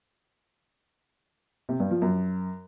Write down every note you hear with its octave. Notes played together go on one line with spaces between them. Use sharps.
C3
G2
F3
F#2